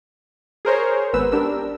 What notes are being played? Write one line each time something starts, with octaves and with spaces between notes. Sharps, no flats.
G#4 A#4 C5 C#5
G#1 B3 B4 E6
D4 G4 A#4 E6